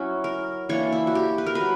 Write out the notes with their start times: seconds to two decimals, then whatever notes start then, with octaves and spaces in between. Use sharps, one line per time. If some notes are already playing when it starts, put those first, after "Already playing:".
Already playing: F#3 C#4 E4 F#4
0.24 A#4
0.69 E3 A#3 D4 C#5
0.92 E4
1.07 F#4
1.15 G4
1.38 B4
1.46 A#4
1.55 B4
1.61 F#3